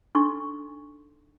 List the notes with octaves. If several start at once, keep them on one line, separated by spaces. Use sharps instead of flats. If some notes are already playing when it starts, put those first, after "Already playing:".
D4 D#4 A4 C6 C#6